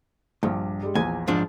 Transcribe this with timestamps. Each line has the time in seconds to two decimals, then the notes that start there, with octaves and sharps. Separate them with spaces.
0.43 A#1 G2
0.83 G3 G#3
0.95 A#1 E2 G#5
1.27 G#2 F3 D4